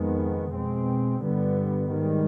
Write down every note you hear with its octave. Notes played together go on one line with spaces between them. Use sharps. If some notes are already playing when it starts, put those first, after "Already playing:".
Already playing: F2 D#3 G#3 B3
B2 G#3 C4
G2 D3 G3 B3
G#2 D#3 G3